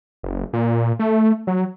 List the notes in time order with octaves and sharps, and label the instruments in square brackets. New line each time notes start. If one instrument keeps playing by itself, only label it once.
[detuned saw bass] F#1
A#2
A3
F#3